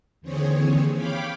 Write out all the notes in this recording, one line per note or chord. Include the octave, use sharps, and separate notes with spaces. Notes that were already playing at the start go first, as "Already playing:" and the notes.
D#2 D3 E3 C4 G#4 C#5
C#5 F5 G5 B5 D6